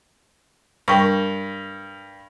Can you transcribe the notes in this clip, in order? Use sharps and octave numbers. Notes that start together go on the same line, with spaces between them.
G2 A#4 G5 C#6